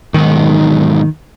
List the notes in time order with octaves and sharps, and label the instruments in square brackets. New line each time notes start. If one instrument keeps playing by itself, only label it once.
[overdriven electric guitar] B1 G#2 [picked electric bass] D#3